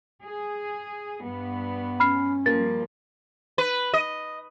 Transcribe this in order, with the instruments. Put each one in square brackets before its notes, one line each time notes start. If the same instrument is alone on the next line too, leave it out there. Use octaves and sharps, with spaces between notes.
[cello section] G#4
G2 B3
[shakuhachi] C#4 [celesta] B5 F6 C7
[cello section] F3 G3 [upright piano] A#3 [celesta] A6
[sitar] B4
D#5